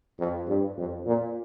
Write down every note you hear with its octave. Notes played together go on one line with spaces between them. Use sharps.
F2
G2
F2
A#2